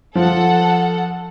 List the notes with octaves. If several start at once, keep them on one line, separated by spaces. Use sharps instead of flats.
F3 A4 F#5